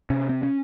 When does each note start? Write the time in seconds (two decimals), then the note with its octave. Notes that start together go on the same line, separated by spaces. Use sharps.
0.10 C3 C#4
0.29 C4
0.43 C#4